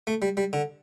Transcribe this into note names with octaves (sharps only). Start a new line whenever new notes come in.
A3
G3
G3
D3